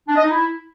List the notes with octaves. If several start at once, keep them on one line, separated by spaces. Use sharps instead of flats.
D4
D#5
D#4
E4